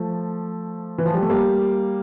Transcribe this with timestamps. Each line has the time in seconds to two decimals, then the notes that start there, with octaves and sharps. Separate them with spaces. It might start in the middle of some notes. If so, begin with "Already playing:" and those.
Already playing: F3 A3
0.98 E3
1.06 F3
1.14 G3
1.22 A3
1.30 G3 A#3